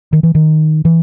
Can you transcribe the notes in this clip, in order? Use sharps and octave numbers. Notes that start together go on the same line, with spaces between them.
D#3
E3
D#3
E3